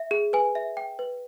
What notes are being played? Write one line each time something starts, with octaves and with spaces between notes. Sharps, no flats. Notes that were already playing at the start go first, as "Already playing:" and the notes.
Already playing: E5
G#4
B4 G#5
E5
G5
B4